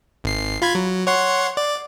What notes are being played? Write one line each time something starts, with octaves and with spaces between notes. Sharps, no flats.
G#1 C7
F4 B5 G#6
F#3
C#5 F#5 C6
D5